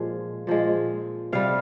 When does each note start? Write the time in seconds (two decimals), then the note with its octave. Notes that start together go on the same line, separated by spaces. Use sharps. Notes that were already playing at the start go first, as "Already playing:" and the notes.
Already playing: A#2 F3 G#3
0.47 A#2 F3 G#3
1.32 C3 G3 F5